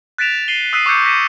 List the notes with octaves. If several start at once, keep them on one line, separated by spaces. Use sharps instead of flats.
F#6 A6 B6 D7 E7 F7
C7 D#7 F#7 G7
D#6 E6 F#6 B6 C7 D#7
C#6 D6 E6 F#6 G6 C#7
A#6 B6 C#7 D#7 E7